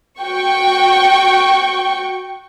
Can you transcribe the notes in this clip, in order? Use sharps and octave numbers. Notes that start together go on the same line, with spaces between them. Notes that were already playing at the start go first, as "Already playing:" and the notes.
F#4 G5 C#6